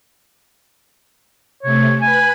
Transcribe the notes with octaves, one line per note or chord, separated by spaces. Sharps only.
C3 A3 C#5
B4 G#5 B5 F#6